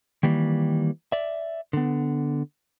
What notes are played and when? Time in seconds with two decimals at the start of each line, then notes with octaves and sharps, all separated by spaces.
0.23 D#3 E3 G3 A#3
1.12 D5 E5
1.73 D3 B3